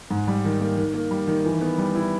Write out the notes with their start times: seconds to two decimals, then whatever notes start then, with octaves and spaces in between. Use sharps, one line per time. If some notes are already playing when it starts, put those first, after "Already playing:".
0.11 G#2
0.28 G3
0.45 D#3
0.60 A#3
0.77 D#3
0.94 A#3
1.11 G3
1.27 D#3
1.46 E3
1.61 B3
1.78 G3
1.95 E4